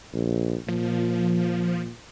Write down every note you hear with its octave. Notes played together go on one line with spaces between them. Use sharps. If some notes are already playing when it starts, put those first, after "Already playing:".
A#1
A#2 F3